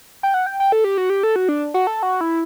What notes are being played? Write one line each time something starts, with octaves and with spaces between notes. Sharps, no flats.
G5
F#5
G5
G5
A4
G4
F#4
G4
A4
F#4
D4
F#4
A4
F#4
E4